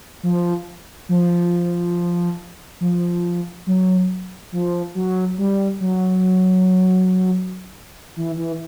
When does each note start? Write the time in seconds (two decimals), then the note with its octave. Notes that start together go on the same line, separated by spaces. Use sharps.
0.23 F3
1.09 F3
2.81 F3
3.67 F#3
4.52 F3
4.95 F#3
5.38 G3
5.81 F#3
8.17 E3
8.37 E3